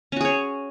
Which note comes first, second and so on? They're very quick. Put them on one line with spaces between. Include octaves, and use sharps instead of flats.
C#4 F#4 G#4 C#5